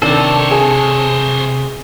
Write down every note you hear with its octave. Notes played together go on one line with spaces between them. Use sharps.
C3 D#3 D4 A4 C5 C#5
G#4